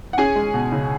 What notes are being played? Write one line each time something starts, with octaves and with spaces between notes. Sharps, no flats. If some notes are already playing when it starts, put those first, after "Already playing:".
F#5
C#4 G#4 G#5
G#3
B2
C#2